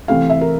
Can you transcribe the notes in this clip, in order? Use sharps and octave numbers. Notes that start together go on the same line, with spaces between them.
C3 E3 A3 C4 F5
E5
A#4